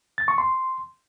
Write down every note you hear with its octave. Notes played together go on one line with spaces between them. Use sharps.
A6
C#6
C6